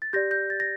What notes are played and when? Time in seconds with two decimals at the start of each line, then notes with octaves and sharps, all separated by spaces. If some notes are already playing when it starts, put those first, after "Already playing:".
0.02 A6
0.13 G4 D5 G6 A#6
0.31 G6 A#6
0.50 A6
0.60 A#6